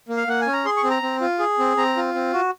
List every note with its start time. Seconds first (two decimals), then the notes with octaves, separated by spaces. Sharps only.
0.09 A#3
0.17 F5
0.27 A#3 F#5
0.41 G#5
0.47 C#4
0.53 A#5
0.65 G#4 C6
0.77 C#6
0.84 C4
0.90 A#5
1.02 C4
1.21 F4
1.39 G#4
1.59 C4
1.77 C4 A#5
1.97 F4
2.14 C4
2.33 F#4